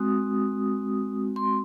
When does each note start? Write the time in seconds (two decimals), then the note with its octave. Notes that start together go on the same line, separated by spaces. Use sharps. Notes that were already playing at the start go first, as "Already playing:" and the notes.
Already playing: G#3 C4 F#4 D#6
1.36 C6